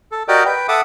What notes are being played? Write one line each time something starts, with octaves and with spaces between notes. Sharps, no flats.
A4
F#4 G4 A#4 D5 D#5 G5
B4 G5
A4 E5 F#5 D6 D#6